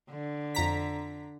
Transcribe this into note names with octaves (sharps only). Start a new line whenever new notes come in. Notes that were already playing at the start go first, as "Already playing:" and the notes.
D3
F2 A#5 B6